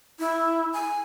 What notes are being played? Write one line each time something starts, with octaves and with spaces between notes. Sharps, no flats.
E4
G#5